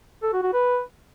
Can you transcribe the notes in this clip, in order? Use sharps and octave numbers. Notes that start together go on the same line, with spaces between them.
A4
F#4
F#4
B4